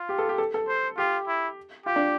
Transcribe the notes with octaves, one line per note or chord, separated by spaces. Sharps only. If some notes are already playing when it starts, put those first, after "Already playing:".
Already playing: F4
G4
A4
G4
A4
A4
C5
F4 G4
E4
F4 G4
D4